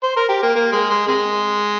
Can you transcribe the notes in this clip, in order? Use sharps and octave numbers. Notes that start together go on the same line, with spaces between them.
C5
A#4
G4
A#3
A#3
G#3
G#3
C3 G#3